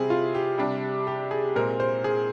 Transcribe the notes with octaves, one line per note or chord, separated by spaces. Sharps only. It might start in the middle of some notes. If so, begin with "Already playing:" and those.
Already playing: C3 G3 C4 G#4
F4
G4
C3 G3 D4
G4
G#4
A#2 G#3 C4 A#4
C5
G#4